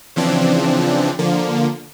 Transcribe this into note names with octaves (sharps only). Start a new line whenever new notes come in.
C#3 E3 F3 C4 D4
D3 F3 A#3